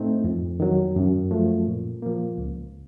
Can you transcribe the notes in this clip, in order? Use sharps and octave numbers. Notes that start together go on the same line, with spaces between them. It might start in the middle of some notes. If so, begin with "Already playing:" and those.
Already playing: A2 A3 C4 D#4
F2
D#3 F#3
F#2
F3 A3
A#2
F3 A#3
C#2